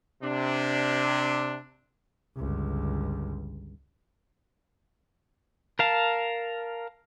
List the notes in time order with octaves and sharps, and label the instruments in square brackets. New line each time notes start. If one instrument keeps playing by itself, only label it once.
[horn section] C3 D4
[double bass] G1 C#2
[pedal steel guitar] A#4 F5 A5